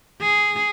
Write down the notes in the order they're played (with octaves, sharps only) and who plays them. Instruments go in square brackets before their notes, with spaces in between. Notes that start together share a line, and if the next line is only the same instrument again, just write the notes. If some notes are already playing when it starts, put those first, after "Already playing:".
[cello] G#4